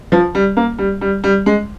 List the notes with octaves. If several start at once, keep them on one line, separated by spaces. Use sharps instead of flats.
F3
G3
A#3
G3
G3
G3
G#3